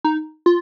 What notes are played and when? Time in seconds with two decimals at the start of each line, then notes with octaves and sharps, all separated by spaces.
0.04 D#4
0.46 F4